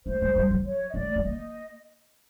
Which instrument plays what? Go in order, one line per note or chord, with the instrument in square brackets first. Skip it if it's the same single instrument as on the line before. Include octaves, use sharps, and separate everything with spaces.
[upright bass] A3 [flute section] C5
[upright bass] G#3
G3
F#3
[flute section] C#5
D#5
[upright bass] A3 [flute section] D5
[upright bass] A3
[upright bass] A#3 [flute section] D#5